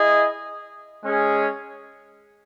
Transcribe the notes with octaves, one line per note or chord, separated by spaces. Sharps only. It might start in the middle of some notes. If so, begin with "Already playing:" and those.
Already playing: E4 G#4 D#5
G#3 C#4 G#4